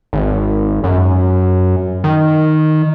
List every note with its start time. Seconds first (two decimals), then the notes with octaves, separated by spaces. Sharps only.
0.13 G#1
0.84 F#2
2.04 D#3